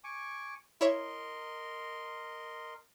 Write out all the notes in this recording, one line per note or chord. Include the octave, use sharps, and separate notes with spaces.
G#5 C#6 D6
E4 A#4 C#5 D#5 E5 C6